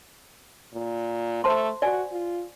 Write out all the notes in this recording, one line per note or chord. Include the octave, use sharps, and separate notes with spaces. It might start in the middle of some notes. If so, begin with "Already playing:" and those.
A#2
A3 C5 A5 C6
F#4 D5 G#5
F4